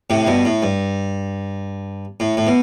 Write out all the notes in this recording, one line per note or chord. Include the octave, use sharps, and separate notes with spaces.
A2 C3
G2 B2
A2
G2
A2
A2
B2